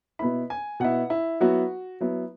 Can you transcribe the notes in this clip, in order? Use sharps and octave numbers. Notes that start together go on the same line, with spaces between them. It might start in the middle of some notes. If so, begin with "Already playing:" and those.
B2 B3 E4 B5
G#5
B2 B3 E4 F#5
E4
F#3 B3 E4 F#4
F#3 B3 E4